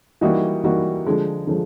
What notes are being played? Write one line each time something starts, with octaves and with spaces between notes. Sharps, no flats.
E3 G3 A#3 D#4 F#4
E3 G3 A#3 D#4 F#4
D3 F3 G#3
D3 F3 G#3